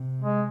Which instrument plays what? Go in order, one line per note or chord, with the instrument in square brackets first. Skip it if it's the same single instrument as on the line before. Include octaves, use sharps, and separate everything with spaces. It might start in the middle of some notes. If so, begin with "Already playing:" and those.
Already playing: [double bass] C3
[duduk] G#3